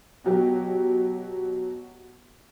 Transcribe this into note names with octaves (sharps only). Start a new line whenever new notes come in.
B2 F#3 G4